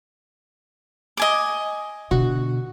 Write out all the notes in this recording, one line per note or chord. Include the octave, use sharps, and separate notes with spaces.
D#5 G#5 D6
B2 D3 F#4